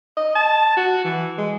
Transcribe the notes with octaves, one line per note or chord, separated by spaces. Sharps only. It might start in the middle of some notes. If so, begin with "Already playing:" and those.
D#5
A5
F#4
E3
G#3